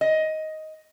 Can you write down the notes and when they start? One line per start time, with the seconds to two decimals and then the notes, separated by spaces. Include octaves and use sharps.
0.01 D#5